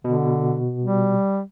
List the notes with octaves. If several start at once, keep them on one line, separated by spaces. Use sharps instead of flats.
B2 D3
G3